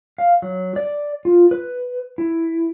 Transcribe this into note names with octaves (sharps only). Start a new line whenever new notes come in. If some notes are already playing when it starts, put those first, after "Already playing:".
F5
F#3
D5
F4
B4
E4